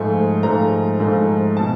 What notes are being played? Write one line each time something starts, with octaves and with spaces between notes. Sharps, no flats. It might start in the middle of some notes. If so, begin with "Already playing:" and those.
Already playing: G#2 F3 A3
G#2 F3 A3 A#5
G#2 F3 A3
B2 A5